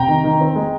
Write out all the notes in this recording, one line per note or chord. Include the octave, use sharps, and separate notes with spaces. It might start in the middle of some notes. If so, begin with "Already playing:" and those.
Already playing: C3 G5 A#5
D#3
D#3
C4
G#3